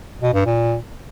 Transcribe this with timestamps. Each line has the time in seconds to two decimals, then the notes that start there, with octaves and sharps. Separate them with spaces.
0.22 B2
0.34 G2
0.46 A#2